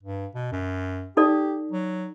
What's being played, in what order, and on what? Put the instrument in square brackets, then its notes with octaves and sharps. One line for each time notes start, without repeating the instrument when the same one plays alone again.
[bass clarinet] G2
B2
F#2
[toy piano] D#4 A4 D5 [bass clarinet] G4
[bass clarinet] F#3